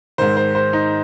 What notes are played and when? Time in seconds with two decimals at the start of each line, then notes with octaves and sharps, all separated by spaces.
0.18 G#2 D#3 C5
0.37 C5
0.55 C5
0.73 D#4